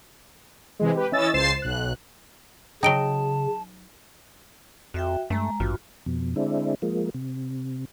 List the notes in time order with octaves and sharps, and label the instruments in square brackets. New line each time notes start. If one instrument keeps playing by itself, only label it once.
[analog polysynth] C3 E3 G#3
G4 B4
E3 C#4 D#5 E6 A6
C#2 C5 A6 C7 E7
B1 F#6
[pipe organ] C#3 [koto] F#3 D#4 [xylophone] G5 D7 G7 [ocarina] A5
[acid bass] F2 [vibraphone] F#4 E5 G5
[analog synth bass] G2 [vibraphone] G#3 A#5 [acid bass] A3
[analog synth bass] A1 [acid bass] G2 [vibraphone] F4 F#4
[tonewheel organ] F2 B2
D3 G#3 C4 D4 E4
F3 G#3 A#3
C3